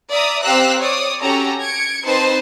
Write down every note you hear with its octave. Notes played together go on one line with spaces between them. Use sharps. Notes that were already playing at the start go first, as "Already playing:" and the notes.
D5 E5 A#5 D#6
C4 G4 F5 A#5 E6 F#6
C#5 D5 D#6
C#4 F#4 G4 A4 A#5
G#6 C#7 D7
C4 D#4 B4 C5 A5 C6